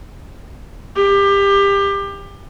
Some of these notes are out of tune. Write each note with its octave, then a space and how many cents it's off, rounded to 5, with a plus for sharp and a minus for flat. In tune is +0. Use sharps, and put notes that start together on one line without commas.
G4 +25